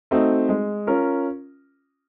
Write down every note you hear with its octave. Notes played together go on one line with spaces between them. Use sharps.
A3 C4 D#4 F#4
G#3
C#4 F4 A#4